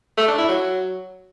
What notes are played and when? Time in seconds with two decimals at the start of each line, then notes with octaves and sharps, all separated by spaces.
0.17 A3
0.27 D4
0.38 E4
0.48 F#3